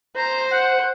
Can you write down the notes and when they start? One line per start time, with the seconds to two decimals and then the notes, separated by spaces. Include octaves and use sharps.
0.16 C5 A#5
0.52 F#5